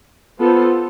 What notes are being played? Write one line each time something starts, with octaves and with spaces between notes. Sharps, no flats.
B3 F4 A4 C5